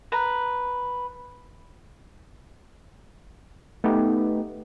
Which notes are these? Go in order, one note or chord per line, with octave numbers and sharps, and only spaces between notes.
B4 A#5
A3 B3 D#4 G4